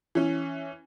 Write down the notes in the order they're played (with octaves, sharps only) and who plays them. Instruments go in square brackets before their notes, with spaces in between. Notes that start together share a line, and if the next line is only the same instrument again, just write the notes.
[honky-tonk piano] E3 C#4